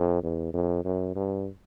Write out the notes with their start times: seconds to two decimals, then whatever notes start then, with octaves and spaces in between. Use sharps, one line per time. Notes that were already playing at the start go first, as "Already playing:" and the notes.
Already playing: F2
0.23 E2
0.54 F2
0.85 F#2
1.15 G2